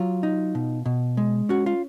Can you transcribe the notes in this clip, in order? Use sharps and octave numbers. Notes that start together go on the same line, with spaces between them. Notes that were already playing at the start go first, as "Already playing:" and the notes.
Already playing: F#3 F4
D#4
B2
B2
G#3
C#4 F#4
F4